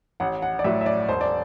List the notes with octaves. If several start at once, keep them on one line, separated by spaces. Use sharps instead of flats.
A1 F#5
F#5
D5
A2 F#3 E5
E5
D5
E1 C5
D5